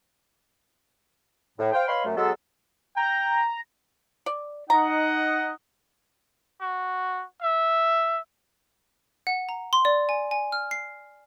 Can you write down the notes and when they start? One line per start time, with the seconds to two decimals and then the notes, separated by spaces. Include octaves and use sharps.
1.59 A2
1.73 C5 F5 G5
1.88 B4 C#5 D#5 F5 B5 C6
2.05 F#2 A3
2.17 F#3 G#3 B3 A4
2.97 G5 A#5
4.26 D5
4.70 D#4 D#5 F#5 A#5
6.61 F#4
7.42 E5
9.27 F#5
9.49 A#5
9.73 C6
9.85 D5
10.09 G#5
10.31 G#5
10.52 F6
10.71 C7